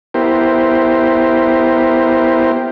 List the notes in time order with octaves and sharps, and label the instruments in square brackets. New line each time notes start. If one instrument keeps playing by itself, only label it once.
[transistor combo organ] B3 E4 G4 A#4 C5